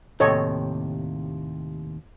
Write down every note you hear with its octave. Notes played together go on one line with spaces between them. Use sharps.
D#2 A2 C3 A4 C#5 D#5